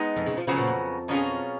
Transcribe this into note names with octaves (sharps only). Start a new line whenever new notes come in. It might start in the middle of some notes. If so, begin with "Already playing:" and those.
Already playing: G#3 B3 D#4
F2
C#3
F3
C#3 F3 F#3 B3 F#4
A#2
F2
B2 F#3 C#4 F4 G#4